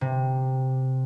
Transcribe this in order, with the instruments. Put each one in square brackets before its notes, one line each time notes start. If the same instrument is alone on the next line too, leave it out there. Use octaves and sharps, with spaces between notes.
[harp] C3